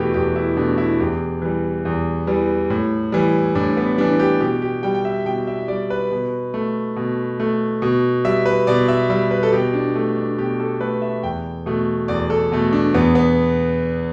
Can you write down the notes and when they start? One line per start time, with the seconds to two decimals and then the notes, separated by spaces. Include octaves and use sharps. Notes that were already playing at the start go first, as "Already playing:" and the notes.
Already playing: E2 B2 A3 B3 E4 G4
0.14 E2 G4
0.36 E4
0.57 B2 A3 D4
0.78 E4
0.99 E2 G4
1.42 E3 G3
1.85 E2
2.27 E3 G3
2.70 A2
3.12 E3 G3
3.55 A2 D4
3.77 B3
3.98 E3 G3 D4
4.19 G4
4.40 B2 G4
4.62 G4
4.83 G3 G5
4.95 G5
5.05 E5
5.26 B2 G5
5.47 E5
5.68 G3 D5
5.90 B4
6.12 B2
6.54 A3
6.96 B2
7.40 A3
7.82 B2
8.25 G3 E5
8.46 B4
8.67 B2 D5
8.88 E5
9.10 G3 E5
9.31 B4
9.43 A4
9.52 B2 G4
9.74 D4
9.95 A3
10.17 D4
10.38 B2 G4
10.60 A4
10.81 A3 B4
11.02 E5
11.23 E2 G5
11.66 B2 A3
12.08 E2 D5
12.30 A4
12.52 B2 A3
12.73 D4
12.94 E2 B3
13.15 B3